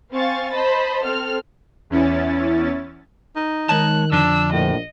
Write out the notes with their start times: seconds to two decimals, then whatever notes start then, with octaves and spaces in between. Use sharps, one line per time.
0.13 C4 F5 G#5 C#6 A6
0.53 C5 D#5 A5 B5
1.03 C4 A4 F6
1.90 E2 C#4 E4 A6
3.36 D#4
3.69 D#3 G#3 C#5 A5 F#6
4.12 F2 D3 F3 D4 E6
4.53 A#1 A2 D#5